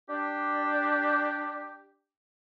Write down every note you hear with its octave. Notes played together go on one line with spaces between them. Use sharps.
D4 G4